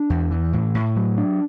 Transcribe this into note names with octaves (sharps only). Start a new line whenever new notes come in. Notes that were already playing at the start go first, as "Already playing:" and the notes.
Already playing: D4
E2
E3
A2
A2
F#3
D4